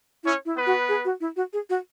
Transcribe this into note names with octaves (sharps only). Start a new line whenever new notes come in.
C#4 E4 C#5
E4
B3 B4
F#4
G#4
F#4
E4
F#4
G#4
F#4